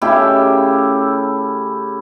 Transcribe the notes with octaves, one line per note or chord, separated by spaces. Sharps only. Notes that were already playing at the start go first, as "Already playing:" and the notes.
C#3 A3 E4 G4